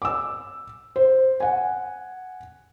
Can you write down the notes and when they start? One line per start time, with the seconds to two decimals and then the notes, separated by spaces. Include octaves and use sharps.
0.02 D6 E6
0.96 C5
1.40 F#5 G#5